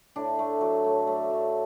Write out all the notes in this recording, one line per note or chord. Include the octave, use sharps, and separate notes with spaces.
A2 D4
A3
F#3
A2
A3
F#3